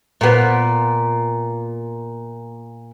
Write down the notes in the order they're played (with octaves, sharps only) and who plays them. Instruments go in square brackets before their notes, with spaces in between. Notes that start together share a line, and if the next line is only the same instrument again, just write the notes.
[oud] A#2 B3